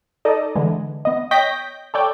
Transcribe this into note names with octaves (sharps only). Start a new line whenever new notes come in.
D#4 A4 D5 D#5
D3 E3 G#3
B3 D#5
C#5 D#5 G5 G6 A#6 B6
A4 C#5 D5 G5